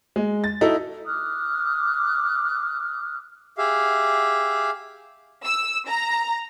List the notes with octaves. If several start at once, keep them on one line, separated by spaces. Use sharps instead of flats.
G#3
A6
D#4 E4 F#4 A4
D6 D#6 F6 F#6
G4 G#4 E5 F5
E6
A#5